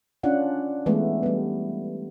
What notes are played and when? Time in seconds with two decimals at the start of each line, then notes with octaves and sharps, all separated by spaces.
0.23 C#4 D4 F4 F#5
0.86 E3 G#3 A3 B3
1.23 G3 B3